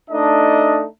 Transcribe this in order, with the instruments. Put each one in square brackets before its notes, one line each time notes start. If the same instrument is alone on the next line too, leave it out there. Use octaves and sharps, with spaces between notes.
[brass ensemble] A3 D4 D#4 D#5